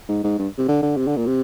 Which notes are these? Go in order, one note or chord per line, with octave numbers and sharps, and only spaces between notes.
G#2
G#2
G2
C3
D3
D3
C3
D3
A#2
C3